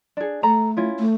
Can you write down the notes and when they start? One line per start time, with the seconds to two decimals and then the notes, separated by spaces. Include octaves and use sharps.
0.17 D4 G#4
0.43 A3 A4 A#5 B5
0.77 C#4 E4 F4
0.99 A3